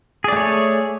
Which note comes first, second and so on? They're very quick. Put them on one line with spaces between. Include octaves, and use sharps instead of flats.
G#4 D5 A3 C#5